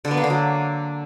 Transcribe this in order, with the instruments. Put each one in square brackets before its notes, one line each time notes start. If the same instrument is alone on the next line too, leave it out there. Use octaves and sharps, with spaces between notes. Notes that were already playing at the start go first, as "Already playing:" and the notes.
[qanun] D3
B3
A#3
D3
F#3